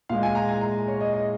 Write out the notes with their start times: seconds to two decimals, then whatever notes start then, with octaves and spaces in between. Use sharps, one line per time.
0.09 A#2 G#3 F5
0.23 G#5
0.35 A#5
0.49 G#5
0.61 A#5
0.88 C#5
1.01 D#5
1.14 D#5